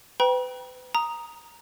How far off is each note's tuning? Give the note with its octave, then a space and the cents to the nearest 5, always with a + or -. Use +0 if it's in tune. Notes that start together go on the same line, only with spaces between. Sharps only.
B4 +35 G5 +0 B5 -45
A#5 +5 D#6 +0